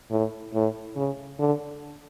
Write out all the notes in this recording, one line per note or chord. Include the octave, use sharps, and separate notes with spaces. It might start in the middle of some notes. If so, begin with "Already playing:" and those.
A2
A2
C#3
D3